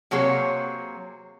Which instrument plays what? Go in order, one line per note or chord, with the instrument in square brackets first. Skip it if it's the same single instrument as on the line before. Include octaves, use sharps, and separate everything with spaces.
[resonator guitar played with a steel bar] C3 F#3 A#3 G#4 C#5